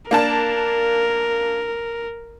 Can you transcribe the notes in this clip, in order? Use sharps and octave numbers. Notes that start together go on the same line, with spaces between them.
A#3 D4 A#4 A5